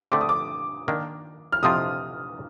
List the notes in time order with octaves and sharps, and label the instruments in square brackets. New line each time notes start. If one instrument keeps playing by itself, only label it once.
[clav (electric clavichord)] D3 A3 C4 [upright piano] D6
[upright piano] D#6
D6
[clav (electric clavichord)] D#3 A#3 D4
[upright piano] F6
[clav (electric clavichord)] F2 C3 F3 C4 F4 [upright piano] D#6